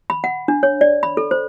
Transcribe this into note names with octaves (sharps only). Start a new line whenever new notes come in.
B5
F#5
D4
C#5
D5
B5
A4
C5